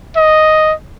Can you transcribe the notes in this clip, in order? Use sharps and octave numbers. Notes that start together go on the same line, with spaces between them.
D#5